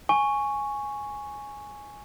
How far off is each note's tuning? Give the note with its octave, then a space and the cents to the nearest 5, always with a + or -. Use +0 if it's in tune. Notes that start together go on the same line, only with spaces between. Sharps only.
G#5 +0 C#6 +0